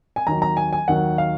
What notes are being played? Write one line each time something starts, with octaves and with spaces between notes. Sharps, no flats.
G#5
D#2 D#3 F#3 A#5
A#5
G#5
G#5
D#2 D#3 F#3 F#5
F5